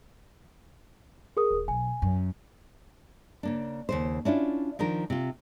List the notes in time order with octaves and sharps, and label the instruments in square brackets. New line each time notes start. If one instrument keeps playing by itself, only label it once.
[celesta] G#4 A#4 D#6
[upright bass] D#1
[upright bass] B1 [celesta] G#5
[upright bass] F#2
[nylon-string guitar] C#3 A#3 D4
D#2 C#3 C5
C#4 D4 E4 F4
D#3 F3 D4 A#4
C3 F4